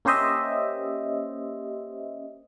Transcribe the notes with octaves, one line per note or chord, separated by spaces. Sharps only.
A#3 C#4 G4 C5 D#5 E5